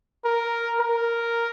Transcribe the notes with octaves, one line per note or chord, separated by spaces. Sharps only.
A#4
A#4